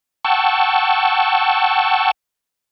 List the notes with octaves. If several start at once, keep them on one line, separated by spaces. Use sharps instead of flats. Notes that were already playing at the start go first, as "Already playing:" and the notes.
F#5 G5 A5 C#6 E6